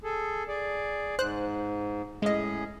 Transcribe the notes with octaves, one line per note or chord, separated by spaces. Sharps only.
G#4 A4
G#4 D5
G#2 C5 F#6
A2 G#3 C#4 G#4 D#5